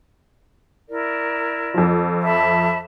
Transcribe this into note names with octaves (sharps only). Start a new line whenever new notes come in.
E4 A#4 D5
F2 F3
E5 A5 B5